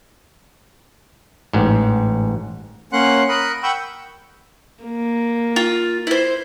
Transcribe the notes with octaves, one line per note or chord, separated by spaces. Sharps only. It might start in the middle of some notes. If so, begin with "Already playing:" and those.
A1 G#2
A#3 C#4 F#5 C6 F#6
A#4 B5 D#6 F#6
F#5 G5 B5 C#6 E6 G6
A#3
F4
E4 C5